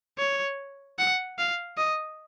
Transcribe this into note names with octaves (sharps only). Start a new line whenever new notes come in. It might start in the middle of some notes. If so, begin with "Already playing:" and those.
C#5
F#5
F5
D#5